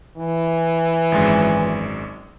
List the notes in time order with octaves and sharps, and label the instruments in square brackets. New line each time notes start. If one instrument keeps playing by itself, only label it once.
[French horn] E3
[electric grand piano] G#1 F#2 G#3